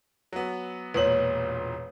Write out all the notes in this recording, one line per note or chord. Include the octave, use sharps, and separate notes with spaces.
F#3 B3
E1 A#2 B4 C#5 F#7